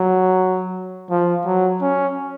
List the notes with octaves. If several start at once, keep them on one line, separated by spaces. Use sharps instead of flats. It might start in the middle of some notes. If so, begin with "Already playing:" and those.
Already playing: F#3
F3
F#3
C#4